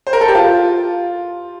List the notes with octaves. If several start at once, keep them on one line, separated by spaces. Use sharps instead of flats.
C5
A#4
A4
G4
F4